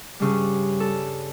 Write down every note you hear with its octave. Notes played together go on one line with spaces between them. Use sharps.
G2 C#3 G3
A4